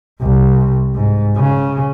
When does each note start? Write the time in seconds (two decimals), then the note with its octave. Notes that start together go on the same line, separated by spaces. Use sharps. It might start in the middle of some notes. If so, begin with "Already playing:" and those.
0.21 C2
0.95 G#2
1.37 C#3